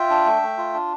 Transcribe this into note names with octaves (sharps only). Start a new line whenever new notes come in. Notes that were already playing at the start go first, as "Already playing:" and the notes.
Already playing: F4 E5 G5
D4
A3
A3
F4
D4